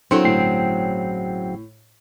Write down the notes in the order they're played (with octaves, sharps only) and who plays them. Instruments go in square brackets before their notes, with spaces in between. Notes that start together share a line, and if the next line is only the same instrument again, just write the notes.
[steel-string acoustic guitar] C#3 F#3 C4 [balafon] D4 E4 A4
[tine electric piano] G1 G5 C7 [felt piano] A2